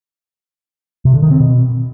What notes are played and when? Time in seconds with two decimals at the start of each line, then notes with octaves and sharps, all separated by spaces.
1.05 C3
1.14 D3
1.23 D#3
1.31 C4
1.40 B2